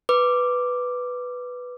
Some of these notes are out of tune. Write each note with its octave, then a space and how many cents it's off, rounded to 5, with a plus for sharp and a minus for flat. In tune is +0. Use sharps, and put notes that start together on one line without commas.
B4 +0 D6 +0